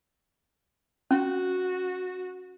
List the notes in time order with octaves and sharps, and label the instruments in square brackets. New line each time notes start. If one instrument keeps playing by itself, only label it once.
[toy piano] C#4 [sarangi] F#4